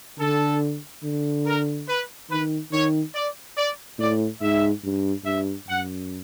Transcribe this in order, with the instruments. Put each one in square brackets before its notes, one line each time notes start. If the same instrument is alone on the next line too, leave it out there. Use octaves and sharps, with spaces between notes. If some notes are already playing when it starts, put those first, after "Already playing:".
[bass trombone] D3 [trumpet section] A4
[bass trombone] D3
[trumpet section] A#4
B4
[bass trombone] D#3 [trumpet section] B4
[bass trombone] D#3 [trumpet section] C#5
[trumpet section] D5
D5
[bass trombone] A2 [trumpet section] D5
[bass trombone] G#2 [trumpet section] E5
[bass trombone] G2
[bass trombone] G2 [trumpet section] E5
[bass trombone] F#2 [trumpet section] F#5